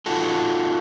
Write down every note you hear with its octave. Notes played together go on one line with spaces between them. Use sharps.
D#4 F4 F#4 A4